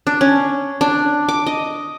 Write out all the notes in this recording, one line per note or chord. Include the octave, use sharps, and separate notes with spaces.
D4
C#4
D4
D6
D#5